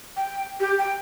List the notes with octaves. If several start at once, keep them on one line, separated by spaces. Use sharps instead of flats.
G5
G4
G5